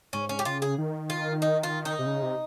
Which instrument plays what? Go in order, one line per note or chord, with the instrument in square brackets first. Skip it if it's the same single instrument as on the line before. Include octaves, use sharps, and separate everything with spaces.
[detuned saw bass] G#2 [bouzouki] C#4
[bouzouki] C#4
G4
[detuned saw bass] C#3 [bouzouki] F4
[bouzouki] G#4
[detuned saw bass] D#3
[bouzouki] F4
D#4
F4
D#4
[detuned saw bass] C3
C#3
C3